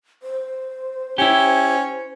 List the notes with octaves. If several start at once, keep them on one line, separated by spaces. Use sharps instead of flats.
C5
C#4 E4 G4